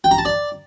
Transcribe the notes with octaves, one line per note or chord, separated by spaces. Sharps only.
G5
A#5
A5
D5